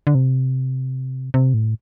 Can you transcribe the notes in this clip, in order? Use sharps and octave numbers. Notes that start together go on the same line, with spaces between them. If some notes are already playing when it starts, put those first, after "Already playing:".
D3
C3
C3
A2